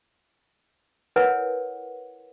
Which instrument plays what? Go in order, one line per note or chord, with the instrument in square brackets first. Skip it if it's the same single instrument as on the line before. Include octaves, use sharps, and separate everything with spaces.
[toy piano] E4 A#4 B4 C#5 F#5 G#5